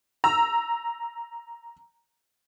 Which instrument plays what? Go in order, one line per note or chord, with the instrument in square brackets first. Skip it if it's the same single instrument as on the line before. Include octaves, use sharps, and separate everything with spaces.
[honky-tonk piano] A#5 E6